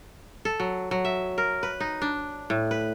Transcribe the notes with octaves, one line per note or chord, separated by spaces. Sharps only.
A4
F#3
F#3
E5
A#4
B4
D#4
D4
A2
B4